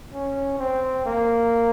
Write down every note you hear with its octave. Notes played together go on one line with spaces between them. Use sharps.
C#4
C4
A#3